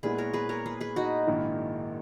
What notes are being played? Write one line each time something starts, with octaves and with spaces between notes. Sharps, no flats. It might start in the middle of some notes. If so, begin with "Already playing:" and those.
A#2 G#3 B3 E4 G#4 B4
A#4 C#5
G#4 B4
A#4 C#5
G#4 B4
G#4 B4
D#4 F#4
A#1 G#2 D#3 A#3 E4